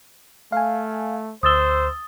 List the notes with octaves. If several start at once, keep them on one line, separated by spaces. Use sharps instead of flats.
A3 F5 G#5
D2 C5 D#6 E6 A6 G7